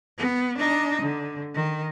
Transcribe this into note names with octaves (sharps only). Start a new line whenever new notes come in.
B3
D4 D#4
D3
D#3